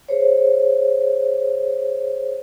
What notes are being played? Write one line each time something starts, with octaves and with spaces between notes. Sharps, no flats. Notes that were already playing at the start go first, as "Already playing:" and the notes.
G#4 C5 C#5